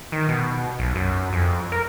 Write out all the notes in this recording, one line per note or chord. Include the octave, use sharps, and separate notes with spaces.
D#3
B2
B1
F#2
F2
A#4